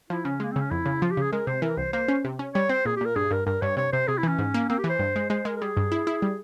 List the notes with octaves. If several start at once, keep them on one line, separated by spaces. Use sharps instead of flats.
F3 E4
C#3 C#4
G#3 A#3
C#3 C4
C#4
F2 E4
C#3
F3 F4
G4
C#3 G#4
G#3 A#4
C3 C5
E3 A#4
C2 C5
A#3 C5
C#4
C3
C#4
G3 C#5
C4 C5
A#2 G#4
G4
A#2 A#4
G2 G#4
G2 A#4
G2 A#4
G2 C#5
C3 C#5
C3 C5
C3 G#4
E4
E3 C#4
G#2
A#3
A#3 C4
G4
E3
C5
G2
G#3
G#3 C5
G#3 A#4
A#4
G3 G#4
G2
E4
E4
G3